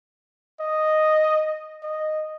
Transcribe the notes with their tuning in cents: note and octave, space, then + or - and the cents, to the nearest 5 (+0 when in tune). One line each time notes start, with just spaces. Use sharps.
D#5 -5
D#5 -5